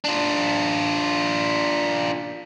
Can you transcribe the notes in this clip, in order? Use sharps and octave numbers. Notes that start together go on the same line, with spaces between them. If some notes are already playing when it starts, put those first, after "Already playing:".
D4 F4